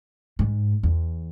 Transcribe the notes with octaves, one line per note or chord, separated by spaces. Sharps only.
G#2
E2